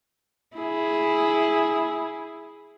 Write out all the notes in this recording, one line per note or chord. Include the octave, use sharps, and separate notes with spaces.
E4 G#4